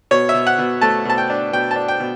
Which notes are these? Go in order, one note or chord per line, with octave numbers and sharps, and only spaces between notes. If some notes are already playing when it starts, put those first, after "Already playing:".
B2 C#5
B2 E5
F#5
B2
A3 A5
B2 A5
G5
D4
B2 G5
A5
D4
G5
B2